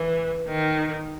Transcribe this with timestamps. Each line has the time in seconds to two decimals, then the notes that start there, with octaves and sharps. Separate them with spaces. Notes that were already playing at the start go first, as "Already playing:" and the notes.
Already playing: E3
0.48 D#3